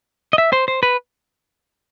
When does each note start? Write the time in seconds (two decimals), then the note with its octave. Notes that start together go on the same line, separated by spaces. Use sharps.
0.33 D#5
0.38 E5
0.53 C5
0.68 C5
0.83 B4